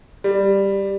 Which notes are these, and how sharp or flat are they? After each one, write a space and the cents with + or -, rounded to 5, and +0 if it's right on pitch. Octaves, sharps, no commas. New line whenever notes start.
G3 +5